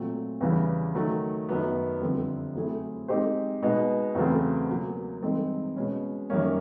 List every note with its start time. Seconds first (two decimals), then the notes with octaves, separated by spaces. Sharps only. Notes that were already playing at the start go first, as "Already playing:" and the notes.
Already playing: A#2 F#3 A3 C4
0.41 E2 C#3 E3 G3
0.95 D#3 F#3 A3
1.49 F#2 D#3 F#3 B3
2.01 F2 D3 G3 C4
2.55 F#3 A3 C4 E4 G#4
3.08 G#3 C4 D#4 G4 C5
3.63 B2 G#3 B3 D#4
4.15 E2 C#3 F#3 A3 C4
4.69 B2 F#3 A#3
5.22 G2 E3 G#3 C4 D#4
5.76 B2 G#3 C#4
6.30 F#2 D#3 G3 A#3 C#4